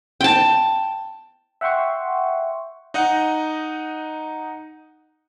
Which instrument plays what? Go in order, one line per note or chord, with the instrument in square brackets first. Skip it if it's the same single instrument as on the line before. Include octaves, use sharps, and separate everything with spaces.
[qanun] G5 A5
[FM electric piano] E5 F#5 G5 C6 C#6
[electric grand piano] D#4 D#5 F#5